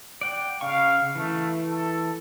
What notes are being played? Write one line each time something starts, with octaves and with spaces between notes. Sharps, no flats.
D5 F#5 G5
C#3 F5 C#6
E3 A3
A4